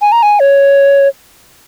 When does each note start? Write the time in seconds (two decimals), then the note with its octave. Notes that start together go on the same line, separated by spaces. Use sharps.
0.02 G#5
0.12 A#5
0.23 G#5
0.40 C#5